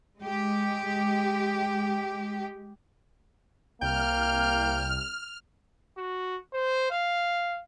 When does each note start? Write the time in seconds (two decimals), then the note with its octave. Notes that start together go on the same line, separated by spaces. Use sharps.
0.19 G#3 G4
3.82 C2 A#3 G5 F6
5.97 F#4
6.53 C5
6.91 F5